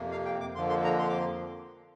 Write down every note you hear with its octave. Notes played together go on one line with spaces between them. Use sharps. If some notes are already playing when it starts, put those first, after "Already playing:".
Already playing: F2 C3 A#3
F5
G5
D6
F2 D3 F3 A#3 C6
C6
A#5
C6
D6
C6